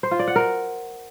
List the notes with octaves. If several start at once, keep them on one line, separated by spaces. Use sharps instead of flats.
C5
F4
D5
F#5
A#4